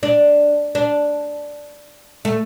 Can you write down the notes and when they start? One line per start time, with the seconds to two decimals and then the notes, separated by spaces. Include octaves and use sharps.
0.03 D4
0.75 D4
2.25 A3